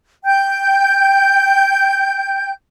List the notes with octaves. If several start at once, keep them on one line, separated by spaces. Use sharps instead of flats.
G5 G6